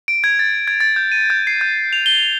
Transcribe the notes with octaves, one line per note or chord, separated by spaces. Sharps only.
D7
G#6
A6
G#6
A6
G6
D#7
G6
C7
G6
F7
G7